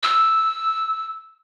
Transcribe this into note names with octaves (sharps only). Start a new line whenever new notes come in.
E6